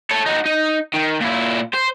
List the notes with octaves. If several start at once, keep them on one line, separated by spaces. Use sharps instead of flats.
A4 C#5
D#4 F#4
D#4
D#3
A#2 E4
C5